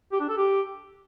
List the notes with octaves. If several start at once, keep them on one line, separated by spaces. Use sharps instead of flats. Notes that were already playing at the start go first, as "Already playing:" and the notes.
G4
D4
A4
G4